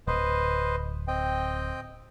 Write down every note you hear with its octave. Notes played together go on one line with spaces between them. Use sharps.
D1 B4 C5 D#5
C4 D#5 G5